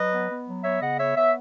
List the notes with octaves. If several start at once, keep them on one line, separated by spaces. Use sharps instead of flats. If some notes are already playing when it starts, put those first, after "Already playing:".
Already playing: F#3 B4 D#5
B3
B3
F#3
B3 C#5 E5
C#3 D#5 F#5
B3 C#5 E5
B3 C#5 E5